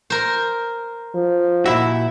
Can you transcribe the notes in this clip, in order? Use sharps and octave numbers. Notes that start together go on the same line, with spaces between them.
A#4 C5
F3
A#2 E4 F#4 E5